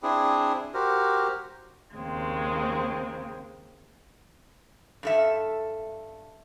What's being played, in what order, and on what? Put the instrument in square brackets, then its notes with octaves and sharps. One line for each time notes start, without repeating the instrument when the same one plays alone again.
[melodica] C4 D4 E4 G#4
F#4 G4 A#4 C5
[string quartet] D#2 C#3 G#3 C4
[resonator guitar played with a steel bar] G2 A4 E5